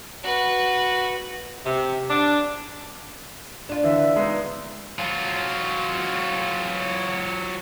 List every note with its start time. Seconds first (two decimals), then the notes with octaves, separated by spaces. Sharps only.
0.23 F#4 B4
1.64 C3
2.10 D4
3.69 D4 F4
3.84 D3 E3 E5
4.16 G#3 B3 D#4
4.99 F#3 F4